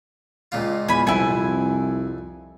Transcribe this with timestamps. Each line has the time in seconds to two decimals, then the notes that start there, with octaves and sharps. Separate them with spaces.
0.52 C#2 A#2 F4
0.89 E2 G#5 B5
1.07 C2 F2 E4 G#5